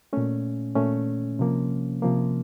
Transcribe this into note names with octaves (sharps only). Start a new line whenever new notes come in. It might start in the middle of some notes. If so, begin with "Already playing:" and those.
A#2 A3 C#4
A#2 A3 C#4
C3 F3 A#3
C3 F3 A#3